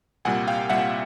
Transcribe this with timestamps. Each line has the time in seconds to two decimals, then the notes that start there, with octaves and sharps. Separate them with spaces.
0.25 C2 A#2 G3 F#5 G#5
0.47 F5 G5
0.70 C2 A#2 G3 E5 F#5